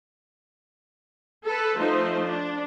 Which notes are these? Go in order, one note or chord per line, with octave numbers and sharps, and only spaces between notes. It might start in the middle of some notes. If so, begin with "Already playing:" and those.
A4 B4
F3 A3 D#4 C5
D4